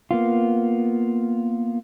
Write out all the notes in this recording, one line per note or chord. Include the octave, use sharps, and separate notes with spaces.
A#3 B3 F4